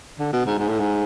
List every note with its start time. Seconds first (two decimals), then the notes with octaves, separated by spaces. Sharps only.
0.19 D3
0.33 B2
0.46 G#2
0.58 G#2
0.69 A2
0.80 G#2